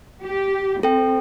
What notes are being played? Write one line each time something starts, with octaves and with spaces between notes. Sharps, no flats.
G4
C4 A4 G5